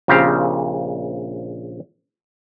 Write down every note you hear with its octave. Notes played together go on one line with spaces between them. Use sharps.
A#1 A#2 C#3 C4 G4 F5